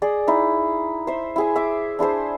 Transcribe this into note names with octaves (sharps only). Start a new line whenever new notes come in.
G#4 D5 D#5
D#4 E4
C5 E5
E4 G#4 G#5
E5 G#5 D6
D4 E4 G#4 C5